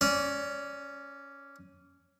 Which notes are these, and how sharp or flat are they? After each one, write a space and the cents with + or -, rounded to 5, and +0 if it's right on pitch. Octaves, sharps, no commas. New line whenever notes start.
C#4 +0 D5 -20